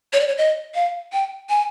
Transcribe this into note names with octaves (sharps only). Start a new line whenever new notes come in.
C#5
D5
C#5
D#5
F5
G5
G#5